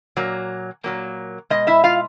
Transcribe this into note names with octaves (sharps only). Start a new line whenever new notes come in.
A#2 F#3 A#3
A#2 F#3 A#3
B2 G#3 D#5
E4 E5
F4 F5